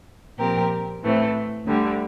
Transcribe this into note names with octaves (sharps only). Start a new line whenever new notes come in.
A#2 F3 C4 G4 A#4
A2 E3 A3 C4
D2 D3 G3